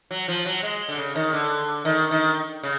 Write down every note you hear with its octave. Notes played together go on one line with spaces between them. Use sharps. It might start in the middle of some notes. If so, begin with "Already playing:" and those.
F#3
F3
F#3
G#3
D3
C#3
D#3
D3
D#3
D#3
C#3